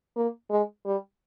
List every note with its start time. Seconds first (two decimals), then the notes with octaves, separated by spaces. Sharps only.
0.16 A#3
0.51 G#3
0.85 G3